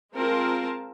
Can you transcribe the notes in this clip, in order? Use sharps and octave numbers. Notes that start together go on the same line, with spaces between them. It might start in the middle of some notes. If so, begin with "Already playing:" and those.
G#3 C4 F4 A#4 A5